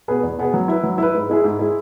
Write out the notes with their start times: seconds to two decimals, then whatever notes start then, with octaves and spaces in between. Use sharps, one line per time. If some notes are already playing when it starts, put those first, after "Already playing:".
0.08 B2 B3 G#4 B4
0.23 E2
0.39 B2 B3 G#4 B4
0.54 F#3
0.68 E4 B4
0.83 F#3
0.98 E4 B4
1.14 G#2
1.29 G#3 E4 G#4
1.44 G#2
1.59 G#3 E4 G#4